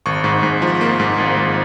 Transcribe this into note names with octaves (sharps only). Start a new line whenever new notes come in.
G#1 C#6
G#2
G#2
F3
A#3
G#2
G#1
G#2